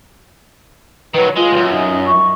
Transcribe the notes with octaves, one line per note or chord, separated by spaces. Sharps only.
D#3 F#3 B4
G#3 F4
C#2 F#2
D#4
C#6